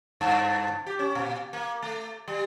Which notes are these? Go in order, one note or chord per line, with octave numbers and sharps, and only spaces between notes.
G2
G4
C#4
A#2
A#3
A3
G3